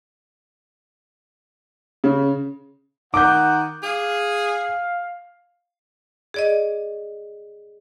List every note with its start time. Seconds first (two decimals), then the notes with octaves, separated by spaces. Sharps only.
2.04 C#3
3.14 D#3 F#5 D6 G6
3.83 G#4 F5
6.34 G#4 D5 D#5